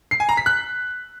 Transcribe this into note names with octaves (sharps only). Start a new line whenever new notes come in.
C7
G#5
A#5
B6
F#6